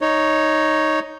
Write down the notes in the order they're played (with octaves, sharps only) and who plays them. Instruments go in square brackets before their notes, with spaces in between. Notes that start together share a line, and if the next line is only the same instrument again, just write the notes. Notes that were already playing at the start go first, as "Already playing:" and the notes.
[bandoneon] D#4 C#5